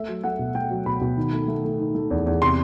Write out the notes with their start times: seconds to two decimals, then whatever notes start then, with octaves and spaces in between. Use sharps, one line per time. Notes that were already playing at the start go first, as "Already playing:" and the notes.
Already playing: A3 E5
0.08 F#3
0.24 A3 F#5
0.39 B2
0.55 A3 G5
0.71 F#3
0.86 B2 B5
1.01 B2
1.17 D#3
1.33 A3
1.48 A3
1.64 A3
1.80 D#3
1.95 A3
2.11 E2
2.26 E2
2.42 C3 C6